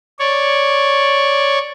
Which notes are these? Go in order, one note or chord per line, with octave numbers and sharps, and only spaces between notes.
C#5 D5